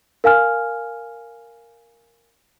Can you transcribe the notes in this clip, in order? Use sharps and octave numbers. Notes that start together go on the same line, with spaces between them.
A#4 F5 G#5 F6